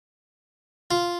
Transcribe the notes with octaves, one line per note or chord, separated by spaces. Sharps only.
F4